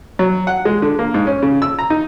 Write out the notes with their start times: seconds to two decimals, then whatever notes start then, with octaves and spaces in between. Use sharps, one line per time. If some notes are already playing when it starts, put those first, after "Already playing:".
0.19 F#3
0.47 F#5
0.65 G#3
0.82 D3
0.99 A#3
1.14 G#2
1.27 C#4
1.43 C#3
1.62 E6
1.79 A#5
1.90 D#4